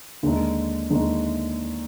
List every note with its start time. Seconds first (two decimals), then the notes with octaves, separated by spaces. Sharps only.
0.23 D#2 D3 G#3 D#4
0.90 D#2 D3 G#3 D#4